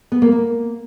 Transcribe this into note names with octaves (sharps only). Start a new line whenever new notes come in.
B3
A#3
A#3